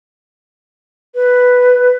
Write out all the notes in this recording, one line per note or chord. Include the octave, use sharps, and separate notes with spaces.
B4